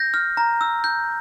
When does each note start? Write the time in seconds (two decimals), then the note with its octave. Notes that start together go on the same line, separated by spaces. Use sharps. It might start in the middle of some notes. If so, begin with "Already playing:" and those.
Already playing: G6 A#6
0.14 F6
0.37 A#5
0.61 E6
0.84 G6